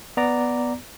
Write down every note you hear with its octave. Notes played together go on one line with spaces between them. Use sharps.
B3 D5 A#5 D6